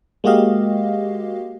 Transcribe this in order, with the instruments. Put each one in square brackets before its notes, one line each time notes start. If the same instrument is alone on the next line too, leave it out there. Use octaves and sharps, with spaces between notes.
[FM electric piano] G#3 A#3 F#4 G4 D#5 F5